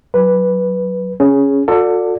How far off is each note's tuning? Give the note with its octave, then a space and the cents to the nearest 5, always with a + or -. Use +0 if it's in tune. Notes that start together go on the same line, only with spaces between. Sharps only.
F#3 +0 B4 -5
C#4 +0 G#4 +0
F#4 -40 A4 +25 D5 +0